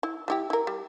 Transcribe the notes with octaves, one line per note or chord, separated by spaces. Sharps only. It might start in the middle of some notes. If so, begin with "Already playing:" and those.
E4
G3 E4 G4
E4 A#4
G3